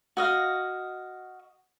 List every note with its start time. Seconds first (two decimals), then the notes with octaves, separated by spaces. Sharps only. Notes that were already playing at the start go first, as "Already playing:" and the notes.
0.17 F#4 D#5 F5